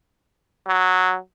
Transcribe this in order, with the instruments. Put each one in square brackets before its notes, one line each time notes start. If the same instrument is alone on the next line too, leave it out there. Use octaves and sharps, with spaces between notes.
[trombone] F#3